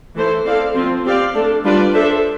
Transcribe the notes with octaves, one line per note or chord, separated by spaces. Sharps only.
E3 A3 E4 A4 C5
C4 E4 A4 D5 F5
F3 C4 F4
C4 G4 D5 F5
A3 D4 A4
G3 D4 F4 B4 D5
D4 A4 C5 E5